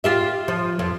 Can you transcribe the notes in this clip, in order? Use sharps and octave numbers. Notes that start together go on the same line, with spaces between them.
F4 G4 E5
F3
F2